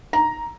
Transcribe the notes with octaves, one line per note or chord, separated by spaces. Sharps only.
A#5